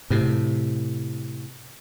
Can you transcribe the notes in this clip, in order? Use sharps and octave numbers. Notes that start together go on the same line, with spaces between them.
A2 C3